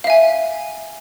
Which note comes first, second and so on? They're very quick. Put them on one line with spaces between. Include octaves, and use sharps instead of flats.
F5 E5 G#5